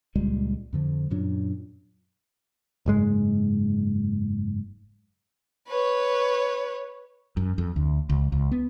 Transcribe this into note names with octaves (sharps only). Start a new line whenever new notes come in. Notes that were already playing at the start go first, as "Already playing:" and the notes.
C#2 A#2 G3 G#3
F2 D3 F3
F#2 A#2 F#3 D4
F#1 G#2 G#3
B4 C#5
F#2
F2
D2
C#2
C#2
B3